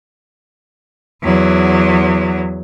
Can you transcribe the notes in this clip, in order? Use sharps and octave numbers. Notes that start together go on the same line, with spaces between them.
E2 F#3